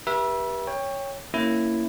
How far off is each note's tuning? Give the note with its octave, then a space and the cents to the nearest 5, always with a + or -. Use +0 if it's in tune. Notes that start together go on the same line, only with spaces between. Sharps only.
G4 +0 B4 -40 E5 +5
C#5 +0 G5 +25
A#3 -10 C#4 +0 E4 +0